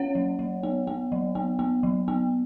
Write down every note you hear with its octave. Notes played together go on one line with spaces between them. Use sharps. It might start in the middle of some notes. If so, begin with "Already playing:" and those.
Already playing: C#4 C#5 F#5
F#3
F#3
B3
B3
F#3
B3
B3
F#3
B3